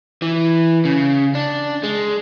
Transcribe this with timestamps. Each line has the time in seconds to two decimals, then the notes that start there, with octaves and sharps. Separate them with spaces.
0.22 E3
0.85 C#3
1.35 D4
1.83 G#3